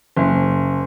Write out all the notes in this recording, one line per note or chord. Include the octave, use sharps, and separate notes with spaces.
F#1